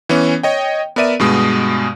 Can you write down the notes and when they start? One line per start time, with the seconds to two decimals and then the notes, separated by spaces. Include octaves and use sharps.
0.09 E3 B3 C#4
0.43 C#5 D#5 G5
0.96 B3 A#4 D5 E5 D#7
1.20 G2 B2 G#3 D#6